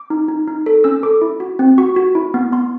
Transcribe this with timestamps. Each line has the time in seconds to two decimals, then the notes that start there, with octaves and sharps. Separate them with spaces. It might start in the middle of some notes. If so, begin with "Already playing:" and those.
Already playing: D6
0.10 D#4
0.28 D#4
0.48 D#4
0.66 A4
0.84 C#4 E6
1.03 A4 D6
1.22 E4
1.40 F#4
1.59 C4
1.78 F#4 C#6
1.96 F#4
2.15 E4
2.34 B3
2.52 B3 C6